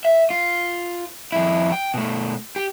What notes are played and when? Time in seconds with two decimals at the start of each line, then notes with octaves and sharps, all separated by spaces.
0.05 E5
0.30 F4
1.32 F2 E4
1.72 G5
1.94 B2 A3
2.56 G4